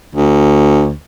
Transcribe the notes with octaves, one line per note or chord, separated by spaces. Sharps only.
D2